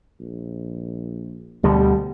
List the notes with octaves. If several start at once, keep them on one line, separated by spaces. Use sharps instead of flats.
A#1
D2 B2 D3 G3